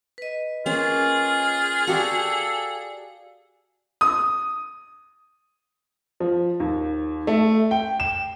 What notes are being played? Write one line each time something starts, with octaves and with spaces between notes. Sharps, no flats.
B4 D#5
A#3 C#4 F4 G#4
F#4 G4 A4 D5 F5 F#5
D#6
F3
D#2
A3
G5
E7